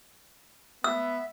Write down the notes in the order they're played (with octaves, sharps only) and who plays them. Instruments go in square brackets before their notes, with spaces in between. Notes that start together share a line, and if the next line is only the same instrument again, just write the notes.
[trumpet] B3 [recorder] E5 [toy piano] E6